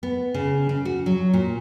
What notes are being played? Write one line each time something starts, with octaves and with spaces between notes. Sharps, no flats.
B3
C#3
C#3
F#4
F#3
A#2